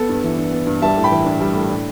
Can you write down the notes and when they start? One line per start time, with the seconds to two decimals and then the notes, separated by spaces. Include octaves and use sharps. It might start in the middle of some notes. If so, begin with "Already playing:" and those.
Already playing: B3 A4
0.09 G2
0.24 E3
0.38 D4
0.52 B3
0.67 G2
0.82 G3 E5 A5
0.97 A2
1.04 G5 B5
1.11 E3
1.25 D4
1.41 G3
1.55 A2
1.70 D4